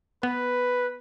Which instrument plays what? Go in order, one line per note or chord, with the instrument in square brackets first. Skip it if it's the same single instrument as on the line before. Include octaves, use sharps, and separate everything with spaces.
[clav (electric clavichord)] B3 [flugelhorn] B4